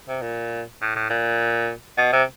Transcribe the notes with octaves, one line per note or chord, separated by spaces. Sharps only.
C3
A#2
A2
A2
A#2
B2
C3